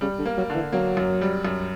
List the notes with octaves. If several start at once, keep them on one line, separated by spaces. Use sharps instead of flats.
C#3 G3
D3
A#3
F#3
D3 E3
F#3 A#3
F#2
G3
F#2